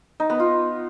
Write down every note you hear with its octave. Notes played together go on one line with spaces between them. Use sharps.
D#4
B3
F4